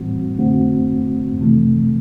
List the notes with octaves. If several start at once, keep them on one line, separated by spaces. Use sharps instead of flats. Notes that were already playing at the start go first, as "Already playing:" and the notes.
Already playing: A2 E3 G3 C4 F#4
D3 A3 C4 F#4
C3 E3 A3